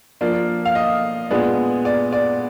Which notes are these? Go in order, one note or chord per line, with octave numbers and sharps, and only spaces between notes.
F3 A#3 D4
F5
D#5
A#2 G#3 B3 D4
D5
D5